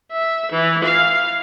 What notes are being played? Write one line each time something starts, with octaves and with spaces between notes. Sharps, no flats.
E5
E3
F5